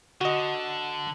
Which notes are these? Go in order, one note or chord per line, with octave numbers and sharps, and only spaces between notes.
D3 F#4 D#5